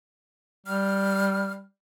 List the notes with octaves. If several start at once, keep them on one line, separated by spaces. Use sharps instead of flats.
G3 F6